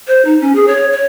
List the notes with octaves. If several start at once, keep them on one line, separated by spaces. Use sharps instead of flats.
C5
D#4
C#4
G#4
C#5
C#5